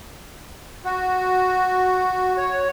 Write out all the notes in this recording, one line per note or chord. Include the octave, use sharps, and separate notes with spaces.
F#4
C#5